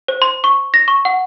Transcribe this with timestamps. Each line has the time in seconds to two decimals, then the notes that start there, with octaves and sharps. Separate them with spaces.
0.08 C5
0.22 C6
0.44 C#6
0.74 A#6
0.88 C#6
1.05 F#5